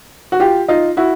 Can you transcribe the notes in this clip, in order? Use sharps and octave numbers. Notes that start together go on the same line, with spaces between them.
F#4
F4 G4
D#4 F4
E4 F#4